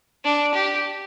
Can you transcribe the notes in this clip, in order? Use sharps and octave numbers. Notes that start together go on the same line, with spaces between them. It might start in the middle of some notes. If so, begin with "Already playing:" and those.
D4
G4